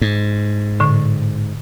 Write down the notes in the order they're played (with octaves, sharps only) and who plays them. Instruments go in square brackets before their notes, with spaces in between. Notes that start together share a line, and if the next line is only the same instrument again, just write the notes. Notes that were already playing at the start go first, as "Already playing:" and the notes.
[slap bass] G#2
[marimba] A2 D3